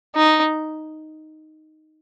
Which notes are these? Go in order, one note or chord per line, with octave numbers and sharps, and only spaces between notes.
D#4